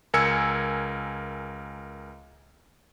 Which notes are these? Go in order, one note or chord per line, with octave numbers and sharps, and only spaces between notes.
C#2 A#4 G#5 E6 G#6 C#7